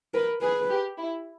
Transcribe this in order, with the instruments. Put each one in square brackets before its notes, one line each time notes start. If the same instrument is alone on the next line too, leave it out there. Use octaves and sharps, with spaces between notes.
[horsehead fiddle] A#4 [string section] B4
[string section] G#4 [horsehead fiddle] B4
[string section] G4
E4